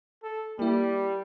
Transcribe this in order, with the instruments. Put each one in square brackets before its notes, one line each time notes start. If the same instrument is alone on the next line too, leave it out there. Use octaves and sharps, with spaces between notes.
[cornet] A4
[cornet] G3 [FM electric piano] A#3 E4